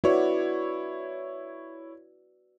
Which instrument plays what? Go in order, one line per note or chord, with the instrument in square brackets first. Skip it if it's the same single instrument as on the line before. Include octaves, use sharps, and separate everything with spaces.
[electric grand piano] E4 C#5 [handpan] F#4 B4 D5